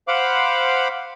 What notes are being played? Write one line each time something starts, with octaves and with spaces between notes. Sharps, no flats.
C5 F5 F#5 B5 D6